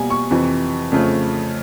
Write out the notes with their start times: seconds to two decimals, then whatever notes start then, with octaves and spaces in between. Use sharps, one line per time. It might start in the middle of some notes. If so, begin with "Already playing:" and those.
Already playing: B2 G3 A#3 G#5
0.10 C#6
0.30 F2 C3 E3
0.92 F2 C#3 F3 A3